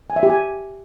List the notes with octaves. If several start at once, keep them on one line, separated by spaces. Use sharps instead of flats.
G#5
E5
G4
G#5